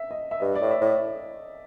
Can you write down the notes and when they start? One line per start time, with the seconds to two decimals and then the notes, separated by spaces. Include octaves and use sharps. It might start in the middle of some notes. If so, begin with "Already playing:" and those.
Already playing: E5
0.11 D#5
0.31 E5
0.40 G2 D#5
0.56 D5
0.61 A2
0.71 E5
0.81 A2